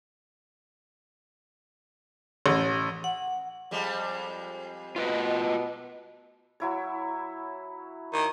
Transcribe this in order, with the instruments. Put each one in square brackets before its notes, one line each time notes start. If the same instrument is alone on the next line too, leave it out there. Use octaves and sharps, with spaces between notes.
[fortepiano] A1
[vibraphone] F#5
[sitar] F2 G3 G#3
[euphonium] B2 [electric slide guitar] F4 B4 D#5
[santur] F#3 E4 C#5
[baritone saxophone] D#3